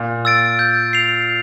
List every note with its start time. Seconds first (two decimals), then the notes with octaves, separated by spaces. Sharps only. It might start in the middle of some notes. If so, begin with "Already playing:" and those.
Already playing: A#2
0.25 E6 A6 D7
0.59 G6
0.93 C7 F7